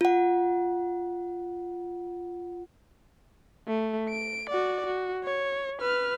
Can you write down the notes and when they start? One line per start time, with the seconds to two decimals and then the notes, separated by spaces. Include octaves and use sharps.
0.01 F4 F#5
3.67 A3
4.10 D7
4.49 F#4 D5
4.86 F#4
5.24 C#5
5.81 B4 F6